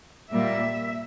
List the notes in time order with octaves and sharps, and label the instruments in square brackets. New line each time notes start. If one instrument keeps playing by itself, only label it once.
[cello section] A#2 G3 A#3 E5